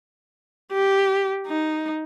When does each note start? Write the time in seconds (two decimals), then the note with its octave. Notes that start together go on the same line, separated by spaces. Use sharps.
0.72 G4
1.47 D#4